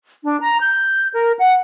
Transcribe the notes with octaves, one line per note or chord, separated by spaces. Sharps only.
D4
A#5
G6
A#4
F#5